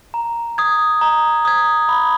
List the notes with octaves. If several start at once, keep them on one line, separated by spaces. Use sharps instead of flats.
A#5
D#6 G#6
A#5
D#6 G#6
B5